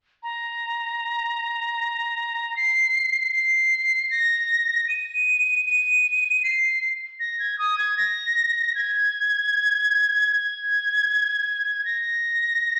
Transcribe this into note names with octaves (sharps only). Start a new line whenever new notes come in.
A#5
C7
C7
A#6
D#7
D#7
C7
A#6
G#6
D#6
G#6
A#6
G#6
G#6
A#6